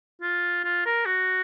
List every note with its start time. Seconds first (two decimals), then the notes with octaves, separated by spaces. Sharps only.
0.21 F4
0.64 F4
0.85 A#4
1.06 F#4